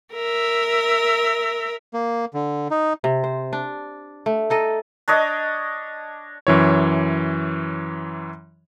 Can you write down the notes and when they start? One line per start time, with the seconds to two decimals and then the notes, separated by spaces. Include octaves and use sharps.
0.14 A#4 E5
1.94 A#3
2.34 D3
2.71 D#4
3.04 C3
3.24 C5
3.53 D4
4.26 A3
4.50 D#4 A4 D#5
5.08 D4 C#5 D#5 D6
6.47 F#2 E3 C#5